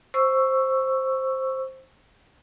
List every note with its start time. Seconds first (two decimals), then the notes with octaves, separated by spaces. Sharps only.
0.14 C5 C#6 E6